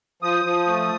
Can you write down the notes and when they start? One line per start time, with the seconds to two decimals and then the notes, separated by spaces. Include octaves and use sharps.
0.22 F3 D#6
0.45 F3
0.68 A3